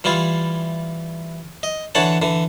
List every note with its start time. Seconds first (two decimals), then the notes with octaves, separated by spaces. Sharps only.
0.04 E3 G3 E4 F4
1.63 D#5
1.95 D3 E3 D4 C#5 F#5 A5
2.22 D3 E3